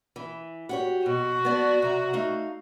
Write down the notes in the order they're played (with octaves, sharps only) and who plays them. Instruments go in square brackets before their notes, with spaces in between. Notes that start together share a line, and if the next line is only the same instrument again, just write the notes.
[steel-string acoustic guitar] E3
F#4 G4 C#5
[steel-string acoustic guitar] B2 [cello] F#4
[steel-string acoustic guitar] B3 D5 A5
C3 A#5
A3 D#4 F5